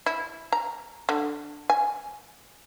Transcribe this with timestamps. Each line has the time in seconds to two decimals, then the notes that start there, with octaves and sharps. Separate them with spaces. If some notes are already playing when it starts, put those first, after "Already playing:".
0.06 E4
0.52 A#5
1.09 D3
1.70 G#5